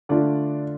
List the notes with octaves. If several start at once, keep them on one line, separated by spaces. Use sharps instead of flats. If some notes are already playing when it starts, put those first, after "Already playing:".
D3 A3 D4 F4 D5